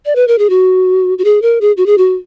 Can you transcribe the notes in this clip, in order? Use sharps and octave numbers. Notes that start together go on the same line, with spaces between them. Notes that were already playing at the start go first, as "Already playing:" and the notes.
D5
B4
A#4
G#4
F#4
F#4
G#4
A#4
G#4
F#4
G#4
F#4